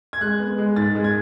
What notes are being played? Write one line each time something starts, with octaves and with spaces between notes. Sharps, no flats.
G#6
G#3 F#6
B3
G#3
G#2 A6
G#3
G#6